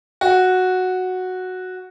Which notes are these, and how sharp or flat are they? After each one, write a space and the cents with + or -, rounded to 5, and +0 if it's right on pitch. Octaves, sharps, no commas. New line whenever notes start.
F#4 -5